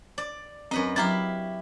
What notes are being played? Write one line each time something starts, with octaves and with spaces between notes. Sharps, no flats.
D5
F#2 C4 B4 D#5
F#3 E4 G4 F5 A#5 A6